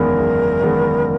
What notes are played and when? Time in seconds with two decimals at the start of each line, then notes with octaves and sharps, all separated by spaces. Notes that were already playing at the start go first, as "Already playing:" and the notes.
Already playing: F#1 E2 D#3 G#3 B3 A#4
0.19 F#1
0.61 E2 D#3 G#3 B3